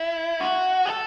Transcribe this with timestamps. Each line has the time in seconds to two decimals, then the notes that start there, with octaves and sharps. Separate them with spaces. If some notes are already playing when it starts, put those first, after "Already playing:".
Already playing: E4
0.40 F#4
0.86 G4
0.90 A4